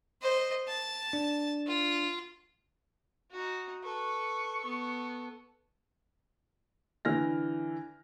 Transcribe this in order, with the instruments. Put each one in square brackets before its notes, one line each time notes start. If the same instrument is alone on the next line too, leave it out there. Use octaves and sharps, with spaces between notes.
[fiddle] C5 D#5
A5
[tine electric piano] D4
[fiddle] F4
[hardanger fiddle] D#4 F#4
[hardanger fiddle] A4 B4 [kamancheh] C#6
[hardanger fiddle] B3 A4
[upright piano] D3 E3 F6 A#6